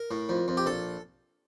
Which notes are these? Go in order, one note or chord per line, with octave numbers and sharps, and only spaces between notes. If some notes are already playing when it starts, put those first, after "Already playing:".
Already playing: A#4
A2
F2
F2
G4
A#1 A4